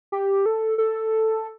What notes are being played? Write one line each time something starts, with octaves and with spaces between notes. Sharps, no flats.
G4
A4
A4